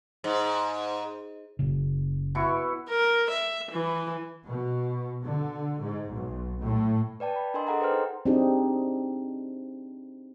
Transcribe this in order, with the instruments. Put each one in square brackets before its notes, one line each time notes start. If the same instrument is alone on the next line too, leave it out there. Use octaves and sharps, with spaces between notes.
[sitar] G#2
[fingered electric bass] F#1 C#3
[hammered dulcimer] B2 E4 C#6
[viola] A#4
E5
E3
[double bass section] B2
D3
G#2
B1
A2
[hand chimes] B4 D5 G5 A5
B5
D4 A#4 D#5 G#5 C6
G#4 A4 D#5 F#5 G#5 A#5
G#4 B4 C5 G5 C6 F6
D#4
[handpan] C4 D4 D#4 G4 G#4